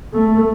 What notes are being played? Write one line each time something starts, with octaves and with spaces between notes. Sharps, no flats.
A3